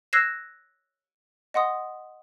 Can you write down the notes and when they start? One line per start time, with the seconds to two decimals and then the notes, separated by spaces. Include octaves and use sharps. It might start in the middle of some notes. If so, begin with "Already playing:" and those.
0.13 E6 F#6 G#6 A#6 C7 E7
1.54 D#5 F#5 C6 D#6